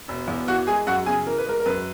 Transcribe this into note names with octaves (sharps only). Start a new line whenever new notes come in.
E1
E2
E3 F#4 F#5
G#3 G#4 G#5
F#2 F#4 F#5
C#3 G#4 G#5
E3 A#4
B4
G#3 A#4
A#4
F#2 B4